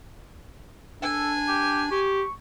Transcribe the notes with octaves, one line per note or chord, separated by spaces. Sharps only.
D4 A4 G#5
G4
G4 C#6